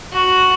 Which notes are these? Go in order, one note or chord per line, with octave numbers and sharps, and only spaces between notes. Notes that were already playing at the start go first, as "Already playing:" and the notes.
F#4